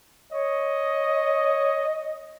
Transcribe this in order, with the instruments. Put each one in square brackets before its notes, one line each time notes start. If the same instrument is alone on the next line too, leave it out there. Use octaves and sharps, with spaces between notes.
[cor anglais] C#5 [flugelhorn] D#5